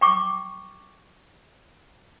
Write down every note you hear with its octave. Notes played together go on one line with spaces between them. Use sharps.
G5 C#6 D6